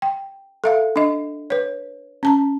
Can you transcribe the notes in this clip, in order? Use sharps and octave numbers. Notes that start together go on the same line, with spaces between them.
G5
A4 E5 F5
D4 D#5
B4 C#5
C#4 A5 A#5